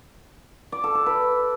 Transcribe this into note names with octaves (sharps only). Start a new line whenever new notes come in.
D5
A4
A4
B4